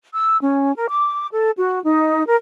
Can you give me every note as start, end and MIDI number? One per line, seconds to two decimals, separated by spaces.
0.15 0.37 88
0.41 0.75 61
0.76 0.86 70
0.89 1.26 86
1.32 1.50 69
1.57 1.80 66
1.84 2.23 63
2.26 2.36 70